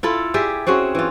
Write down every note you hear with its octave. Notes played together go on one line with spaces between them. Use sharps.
E4 F4 A4
G4 G#4 D5 E5
C4 C#4 F#4 G#4
E3 F4